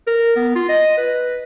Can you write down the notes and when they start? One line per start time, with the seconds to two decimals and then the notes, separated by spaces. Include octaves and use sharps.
0.07 A#4
0.36 B3
0.55 F4
0.69 D#5
0.98 B4